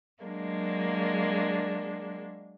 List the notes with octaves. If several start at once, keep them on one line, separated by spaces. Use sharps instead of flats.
F#3 G#3 A#3 D4